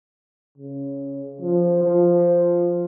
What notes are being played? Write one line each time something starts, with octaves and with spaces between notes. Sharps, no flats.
C#3
F3
F3